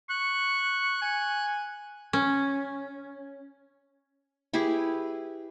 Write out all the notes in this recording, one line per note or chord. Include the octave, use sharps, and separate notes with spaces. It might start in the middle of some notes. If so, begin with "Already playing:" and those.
C#6 F#6
G#5
C#4
E4 G4 G#4 B4